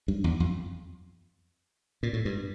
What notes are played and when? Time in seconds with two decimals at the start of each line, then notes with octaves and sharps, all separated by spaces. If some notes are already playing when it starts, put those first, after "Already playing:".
0.08 G2
0.24 E2
0.40 F2
2.03 A#2
2.13 A2
2.25 G2